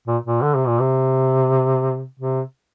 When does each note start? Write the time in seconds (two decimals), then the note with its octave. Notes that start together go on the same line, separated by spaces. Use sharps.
0.07 A#2
0.26 A#2
0.42 D3
0.55 C3
0.67 A#2
0.80 C3
2.20 C3